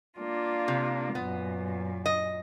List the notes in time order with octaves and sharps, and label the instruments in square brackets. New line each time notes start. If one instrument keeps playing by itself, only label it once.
[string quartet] A#3 D4 F4
[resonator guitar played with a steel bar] C3
[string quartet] F#2 A#2 [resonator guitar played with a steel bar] B3
[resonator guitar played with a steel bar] D#5